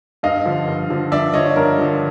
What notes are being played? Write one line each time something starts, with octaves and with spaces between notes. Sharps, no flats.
G2 D#5 F5
D3 F3
G2
D3 F3
G2 D5 E5
D3 F3 C#5 D#5
G2 A#4
D3 F3